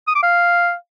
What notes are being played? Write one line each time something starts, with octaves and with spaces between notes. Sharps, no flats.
D#6
D6
F5